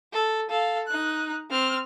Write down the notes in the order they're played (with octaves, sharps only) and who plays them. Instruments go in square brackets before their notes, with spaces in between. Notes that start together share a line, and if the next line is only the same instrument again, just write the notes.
[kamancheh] A4
A4 F5
D#4 F#6
C4 F6